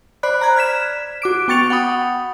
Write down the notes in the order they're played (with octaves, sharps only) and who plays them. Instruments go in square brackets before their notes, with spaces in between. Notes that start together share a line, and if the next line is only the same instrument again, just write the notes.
[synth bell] C5 D5 B5 F#6
A#5 F#6 G#6
F6 G#6 B6 E7
F#4 D6 D7
B3 G5 C#6 A6 C#7 F7
F#5 G5 B5 D#6